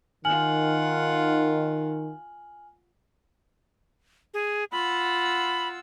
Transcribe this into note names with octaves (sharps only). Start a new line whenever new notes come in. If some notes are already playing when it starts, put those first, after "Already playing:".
D#3 F4 F#5 G#5 F6 F#7
G#4
F4 F#5 B5 E6